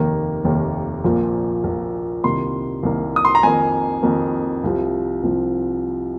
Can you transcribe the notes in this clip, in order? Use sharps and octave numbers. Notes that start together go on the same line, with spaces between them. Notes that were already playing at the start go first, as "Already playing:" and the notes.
Already playing: F1 D#2 D#3 A#3
F1 D#2 D#3 A#3
A#1 A#2 F3 A#3
A#1 A#2 F3 A#3
C2 C3 D#3 A#3 C6
C2 C3 D#3 A#3
D#6
C6
A#5
F2 D#3 A#3 G#5
F2 D#3 A#3
C2 C3 F3
C2 C3 F3